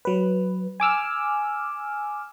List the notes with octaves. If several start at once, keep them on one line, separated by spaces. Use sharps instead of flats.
F#3 B4
G#5 D6 E6 F6